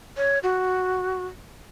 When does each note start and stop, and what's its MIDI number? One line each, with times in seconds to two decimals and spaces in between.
0.17 0.39 73
0.43 1.25 66